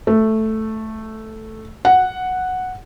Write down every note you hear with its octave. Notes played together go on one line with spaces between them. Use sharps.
A3
F#5